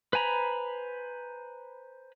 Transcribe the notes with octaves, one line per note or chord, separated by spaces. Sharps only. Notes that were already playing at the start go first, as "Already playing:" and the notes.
B4 C5 G#5 A#5 B5